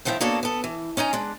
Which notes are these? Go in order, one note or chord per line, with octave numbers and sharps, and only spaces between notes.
A2 D#3 F3 E4 F5 G5
A#3 B3 D4 F#4 A4 C#5
B3 A4
E3
C#4 D#4 G#5 A#5
G#3 D4